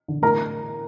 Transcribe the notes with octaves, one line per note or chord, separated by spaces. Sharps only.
D3
A2 A#4 A#5